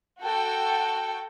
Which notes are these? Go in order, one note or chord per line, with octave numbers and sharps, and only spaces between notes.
F#4 A4 G5